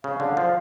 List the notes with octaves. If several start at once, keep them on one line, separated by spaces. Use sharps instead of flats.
C#3 F5
D3
F3